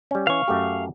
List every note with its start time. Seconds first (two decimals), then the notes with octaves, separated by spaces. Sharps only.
0.11 G3 C#4
0.27 E3 C#4 F5 C#6
0.48 F#2 A3 G4